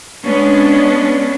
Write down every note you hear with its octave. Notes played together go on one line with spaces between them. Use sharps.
G#3 B3 C#4 D4